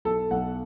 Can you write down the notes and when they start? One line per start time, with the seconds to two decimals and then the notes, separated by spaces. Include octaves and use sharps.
0.05 B1 A4
0.31 B1 F#5